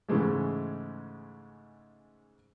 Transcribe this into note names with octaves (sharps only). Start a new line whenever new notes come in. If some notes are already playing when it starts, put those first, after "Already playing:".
G#2 C#3 E3 G#3 A3